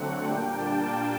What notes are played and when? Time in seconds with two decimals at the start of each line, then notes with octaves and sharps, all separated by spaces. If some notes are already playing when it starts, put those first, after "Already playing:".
Already playing: D3 F#3 A3 C4 F#5
0.25 A#2 G3 A#3 D4 G5
0.57 A5